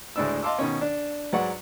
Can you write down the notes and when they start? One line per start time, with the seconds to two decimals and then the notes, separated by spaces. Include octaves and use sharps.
0.16 D2 A2 G#3 D4 D5 E6
0.43 D#5 F5 A5 C6 D6 E6
0.59 B2 D#3 C#4
0.81 D4
1.33 G#2 F#3 B4 D5 F#5 C#6